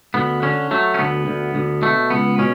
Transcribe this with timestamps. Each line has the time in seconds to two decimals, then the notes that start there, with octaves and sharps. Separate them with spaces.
0.14 D2 B3
0.42 D3 C#4
0.71 F#3 A3
0.94 C#4
0.98 D2 B3
1.27 D2
1.55 D2
1.82 B2 A3
2.10 C#2 B3
2.38 B2 C#4